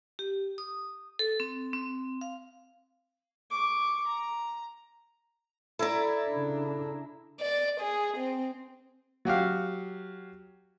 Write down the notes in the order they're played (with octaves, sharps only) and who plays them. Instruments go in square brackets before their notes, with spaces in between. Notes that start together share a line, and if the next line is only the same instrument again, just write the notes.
[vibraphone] G4
D#6
A4
C4
C4
F5
[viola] C#6 D6
A#5
[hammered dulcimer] E4 E5 A#5 [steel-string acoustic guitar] A4 D5
[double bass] C#3 D4
[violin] D5
G#4
C4
[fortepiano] F#3 F#4 G4 F5